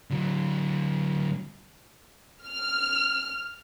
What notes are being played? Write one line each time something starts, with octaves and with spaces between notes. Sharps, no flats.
D3 F#3
F6